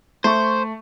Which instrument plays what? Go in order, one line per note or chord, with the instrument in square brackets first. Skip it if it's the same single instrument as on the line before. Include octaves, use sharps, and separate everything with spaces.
[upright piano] A3 C#6 [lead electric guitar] C5